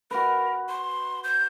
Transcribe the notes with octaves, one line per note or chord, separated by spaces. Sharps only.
F#4 A#4 B4
C6
G6